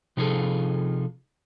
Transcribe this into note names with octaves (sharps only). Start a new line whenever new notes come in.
C3 F3 D#4 F4 G#4 A4